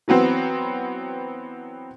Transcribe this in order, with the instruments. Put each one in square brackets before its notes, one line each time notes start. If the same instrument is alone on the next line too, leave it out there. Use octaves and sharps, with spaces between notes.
[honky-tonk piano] E3 F#3 B3 C4